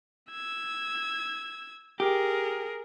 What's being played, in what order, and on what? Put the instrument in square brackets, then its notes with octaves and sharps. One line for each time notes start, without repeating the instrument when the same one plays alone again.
[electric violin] E6 G#6
[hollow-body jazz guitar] G4 [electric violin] G#4 A#4